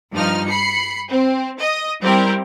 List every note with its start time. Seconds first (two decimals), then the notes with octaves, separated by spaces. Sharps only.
0.13 G2 F3 D#4 F6
0.48 B5 C7 C#7
1.10 C4
1.60 D#5 D#6
2.03 G3 C4 E4 G4 A#4